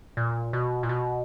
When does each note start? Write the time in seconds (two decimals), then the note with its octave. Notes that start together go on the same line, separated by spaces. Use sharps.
0.17 A#2
0.53 B2
0.83 A#2
0.89 B2